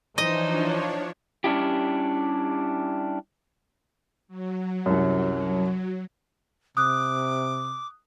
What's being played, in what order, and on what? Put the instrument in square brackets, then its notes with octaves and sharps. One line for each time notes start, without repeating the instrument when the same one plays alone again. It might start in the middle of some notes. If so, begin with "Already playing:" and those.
[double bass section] E3 [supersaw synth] F3 D4 C#5 [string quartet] D#4 C5 [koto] D#5
[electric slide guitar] G3 C#4 D4 E4 G4
[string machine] F#3
[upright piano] C2 F#2
[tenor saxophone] C3 [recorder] D6 [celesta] D#6 F#6